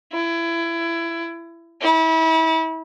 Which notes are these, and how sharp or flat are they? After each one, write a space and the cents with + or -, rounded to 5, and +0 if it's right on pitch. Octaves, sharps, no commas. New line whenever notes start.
E4 +25
E4 -35